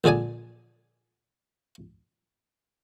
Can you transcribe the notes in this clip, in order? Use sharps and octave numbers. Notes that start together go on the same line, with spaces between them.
A#1 D3 G#4 D5 G#5